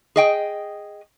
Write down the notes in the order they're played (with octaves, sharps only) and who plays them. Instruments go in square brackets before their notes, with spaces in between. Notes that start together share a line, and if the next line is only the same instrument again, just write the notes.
[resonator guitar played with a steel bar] G#4 D#5 G5